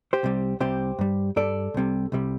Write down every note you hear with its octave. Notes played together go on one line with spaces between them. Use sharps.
G4 C5
C2 C3 G3
C2 C3 G3 G4 C5
G2 G3
G2 G3 A4 D5
C2 C3 G3
C2 C3 G3